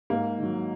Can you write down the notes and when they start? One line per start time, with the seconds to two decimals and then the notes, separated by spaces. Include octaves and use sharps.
0.10 G#2 A#3
0.38 D#3 F#3